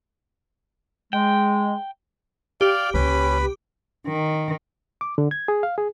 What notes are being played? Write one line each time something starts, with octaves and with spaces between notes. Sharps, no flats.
G#3 G5
G4 D5 F5
C#2 A#3 C#4 B4 B5
D#3
D6
D3
G#6
G#4
F5
G#4